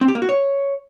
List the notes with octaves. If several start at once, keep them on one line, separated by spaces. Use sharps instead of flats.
C4
G4
A#3
F#4
C#5